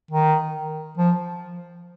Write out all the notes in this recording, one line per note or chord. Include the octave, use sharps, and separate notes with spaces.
D#3
F3